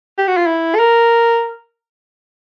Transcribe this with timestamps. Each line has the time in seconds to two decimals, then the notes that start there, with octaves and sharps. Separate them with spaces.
0.18 G4
0.28 F#4
0.37 F4
0.46 E4
0.75 A4
0.80 A#4